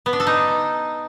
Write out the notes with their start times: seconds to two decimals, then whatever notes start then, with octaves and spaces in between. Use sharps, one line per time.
0.06 B3
0.13 D4
0.20 A4
0.27 D#4